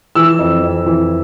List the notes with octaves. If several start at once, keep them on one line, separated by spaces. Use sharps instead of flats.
E3 E6
F2
F2
E3